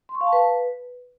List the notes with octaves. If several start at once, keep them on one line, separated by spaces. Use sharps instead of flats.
C6
C#6
F5
A5
B4